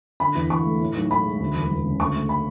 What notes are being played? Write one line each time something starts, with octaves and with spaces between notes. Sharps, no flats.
D3 B5
E2
E2 C#6
A3
A2
B1
B1 B5
G#3
D2
E1
E1
C#3
D2 C#6
A3
B5